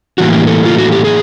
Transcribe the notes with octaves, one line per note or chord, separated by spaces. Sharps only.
A2 E3 G3 A#3 F#4
G4
A4
F4
F#4
G4
G#4